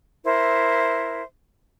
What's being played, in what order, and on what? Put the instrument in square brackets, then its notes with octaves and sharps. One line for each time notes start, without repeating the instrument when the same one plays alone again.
[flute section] E4 A#4 C5 E5